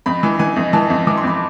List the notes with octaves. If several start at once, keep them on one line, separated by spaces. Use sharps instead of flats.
F2 B5
E3
E3 G#5
F2
E3 A5
F2
E3 D6
C6
F2 B5